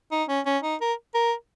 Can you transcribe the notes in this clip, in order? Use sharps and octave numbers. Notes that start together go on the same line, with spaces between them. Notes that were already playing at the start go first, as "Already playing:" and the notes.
D#4
C#4
C#4
D#4
A#4
A#4